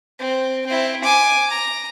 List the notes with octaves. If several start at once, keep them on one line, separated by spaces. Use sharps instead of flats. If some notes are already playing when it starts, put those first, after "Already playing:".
C4
C4 E4
G#5 D6
A#5